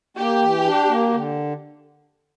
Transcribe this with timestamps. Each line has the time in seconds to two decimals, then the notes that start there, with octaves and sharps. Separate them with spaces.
0.17 A#3 G4
0.41 E3
0.64 D4
0.88 A#3
1.12 D3